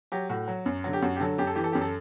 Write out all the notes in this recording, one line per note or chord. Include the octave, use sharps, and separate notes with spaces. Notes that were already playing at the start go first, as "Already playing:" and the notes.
F#3 G4
A2 F#4
F#3
F#2
D3 F#3
G4
F#2 F#4
G4
D3 F#3 A4
F#2 G4
A4
E3 G4
A4
F#2 G4
A4